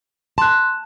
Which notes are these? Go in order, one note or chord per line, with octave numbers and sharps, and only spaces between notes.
A5 C6 F#6